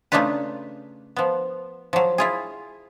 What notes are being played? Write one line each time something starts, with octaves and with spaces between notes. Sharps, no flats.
C#3 A3 D4 D#4 F4 B4
F3 B3
F3 F#3
E4 F4 G#4